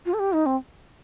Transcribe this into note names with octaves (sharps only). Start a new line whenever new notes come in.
F4
A4
G4
D#4
C4